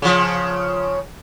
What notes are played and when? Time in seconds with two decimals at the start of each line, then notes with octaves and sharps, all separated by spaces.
0.02 C#3 F3